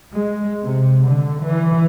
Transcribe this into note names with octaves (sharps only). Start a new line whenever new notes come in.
G#3
C3
D3
E3